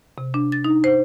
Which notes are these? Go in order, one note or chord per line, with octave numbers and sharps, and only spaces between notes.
C3
D4
A6
D#4
C5